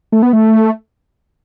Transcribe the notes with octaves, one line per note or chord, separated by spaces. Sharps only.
A3
B3
A3